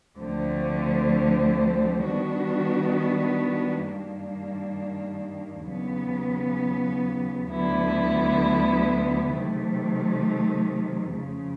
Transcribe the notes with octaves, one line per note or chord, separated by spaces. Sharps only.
D2 D3 F3 A3 C4
D#3 G3 B3 D4 F#4
G2 D#3 G3 A#3 D4
D#2 C#3 F#3 B3
D2 D3 F#3 B3 E4
C3 D#3 F#3 A3
F2 C#3 F3